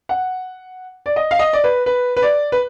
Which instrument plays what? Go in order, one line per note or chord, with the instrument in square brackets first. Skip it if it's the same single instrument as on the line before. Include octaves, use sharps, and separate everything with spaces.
[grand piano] F#5
D5
D#5
F5
D#5
D5
B4
B4
B4
D5
B4